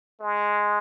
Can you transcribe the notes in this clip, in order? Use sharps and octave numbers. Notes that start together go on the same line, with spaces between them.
G#3